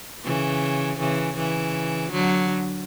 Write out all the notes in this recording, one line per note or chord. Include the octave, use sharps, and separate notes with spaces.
C#3 E3
C#3 E3
C#3 E3
D3 F#3